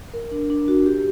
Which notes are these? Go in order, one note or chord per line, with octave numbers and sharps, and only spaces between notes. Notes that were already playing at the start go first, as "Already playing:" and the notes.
A#4
D4
D4
F#4
G4